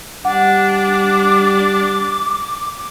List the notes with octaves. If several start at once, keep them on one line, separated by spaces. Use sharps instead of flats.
G3 D4 F#5 D6